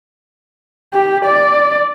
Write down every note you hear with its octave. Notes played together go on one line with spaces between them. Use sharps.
G4
D5